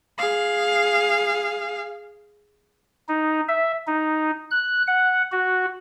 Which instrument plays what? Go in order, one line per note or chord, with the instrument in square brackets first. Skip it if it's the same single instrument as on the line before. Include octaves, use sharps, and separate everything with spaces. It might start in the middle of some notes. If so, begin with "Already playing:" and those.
[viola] G#4 F5
[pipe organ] D#4
E5
D#4
F#6
F#5
F#4